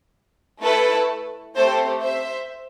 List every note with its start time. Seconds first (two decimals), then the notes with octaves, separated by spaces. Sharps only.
0.63 A3 E4 A4 B4
1.56 A3 C4 G4 A4 C5
2.03 C5 E5